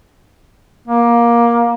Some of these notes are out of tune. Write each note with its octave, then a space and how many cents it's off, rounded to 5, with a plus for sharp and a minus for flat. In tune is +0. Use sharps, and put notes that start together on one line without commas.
A#3 +15